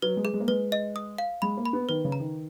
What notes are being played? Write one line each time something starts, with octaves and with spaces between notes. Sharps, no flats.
F#3 B4
G#3
G#4
G#3
A#3
G#3 B4
D#5
D#6
F5
G#3 B5
A#3
B5
B3
D#3 B4
C#3
A#5
D#3